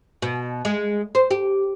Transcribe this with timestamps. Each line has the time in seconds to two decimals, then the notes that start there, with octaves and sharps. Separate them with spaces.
0.22 B2
0.65 G#3
1.15 C5
1.31 G4